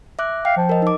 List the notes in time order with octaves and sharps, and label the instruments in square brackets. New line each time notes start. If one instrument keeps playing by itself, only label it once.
[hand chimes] E5 D6 F#6
[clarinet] F5 [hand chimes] G5
[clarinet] F3
[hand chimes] A#4 D#5
D#4 D6